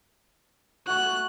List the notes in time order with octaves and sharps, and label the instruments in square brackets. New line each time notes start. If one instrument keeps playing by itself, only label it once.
[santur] A3 F#4 [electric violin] F#6